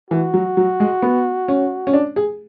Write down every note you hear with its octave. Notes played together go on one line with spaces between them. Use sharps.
E3 F#4
F#3
F#3
G#3
B3
C#4
C#4
D4
G#4